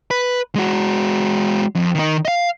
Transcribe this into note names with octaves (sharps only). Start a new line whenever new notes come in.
B4
G#3 F#4
F2
D#3 D#4
D#5 F5